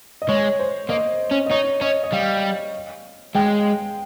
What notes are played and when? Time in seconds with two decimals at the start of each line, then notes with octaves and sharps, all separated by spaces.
0.22 D#5
0.29 G#3 C#5
0.59 C5
0.90 A#3 D#5
1.31 C#4
1.46 D#5
1.51 D#4 C#5
1.81 C#4 D#5
2.04 D#5
2.13 G3 F5
3.35 G#3 G5